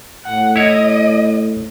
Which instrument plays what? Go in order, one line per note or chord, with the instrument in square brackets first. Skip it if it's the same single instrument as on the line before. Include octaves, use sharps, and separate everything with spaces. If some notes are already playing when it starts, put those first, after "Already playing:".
[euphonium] A2 [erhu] F#5
[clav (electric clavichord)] E4 C#5 [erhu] D#5